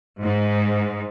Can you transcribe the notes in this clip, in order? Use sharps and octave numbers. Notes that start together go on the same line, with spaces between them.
G#2